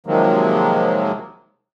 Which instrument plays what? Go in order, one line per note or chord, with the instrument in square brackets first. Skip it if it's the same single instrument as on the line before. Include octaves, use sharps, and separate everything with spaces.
[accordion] C3 D#3 F3 F#3 G#3 A#3